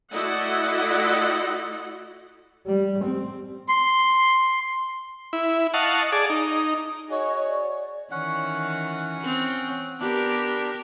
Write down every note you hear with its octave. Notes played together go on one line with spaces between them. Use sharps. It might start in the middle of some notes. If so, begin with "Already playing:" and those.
A3 E4 F#4 D5 D#5 F#5
G3
C4
C6
E4
D#5 F5 F#5 A5 C#6
G#4 D5 A5 D6
D#4
F#4 G#4 C#5 D#5
D5
D#3 E3 C#4 F#5
C4
B3 D4 G4 A#4